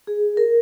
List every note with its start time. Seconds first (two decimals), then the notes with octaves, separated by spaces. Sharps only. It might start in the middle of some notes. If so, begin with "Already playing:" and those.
0.07 G#4
0.37 A#4